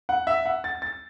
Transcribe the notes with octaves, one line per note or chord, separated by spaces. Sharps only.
F#5
E5
F#5
A6
A6